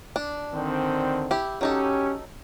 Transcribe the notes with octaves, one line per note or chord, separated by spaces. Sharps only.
D4
D3 D#3 C4
E4 G4
F#3 C#4 D#4 G4 A4